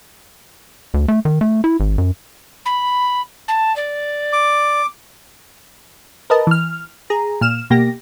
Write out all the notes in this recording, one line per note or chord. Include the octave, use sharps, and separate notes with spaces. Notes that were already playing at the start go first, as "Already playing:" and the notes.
D2
A3
D#3
A3
E4
G#1
F#2
B5
A5
D5
D6
A#4 B4 D#5 A5
E3 F6
G#4 A#5
A#2 F6 E7
B2 A#3 G4 A#6